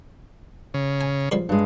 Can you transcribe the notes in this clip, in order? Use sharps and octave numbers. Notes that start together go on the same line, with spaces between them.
C#3
G#5
C#3 F3 G3
G2 G#3